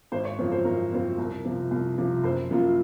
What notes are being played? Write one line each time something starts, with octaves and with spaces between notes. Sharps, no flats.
G#1 C5
C#5
F#2 C#3 F3 C4
C5
G#1 A#4
F#2 C#3 F3 C4
C2 A#4
C3 F3
C2
C3 F3
F#1 C5
F#2 F3 A#3 F4